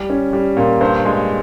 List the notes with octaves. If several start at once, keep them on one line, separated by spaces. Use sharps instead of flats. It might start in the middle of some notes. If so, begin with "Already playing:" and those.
Already playing: G3
C#4
G3
A#2
G2 C5
G#3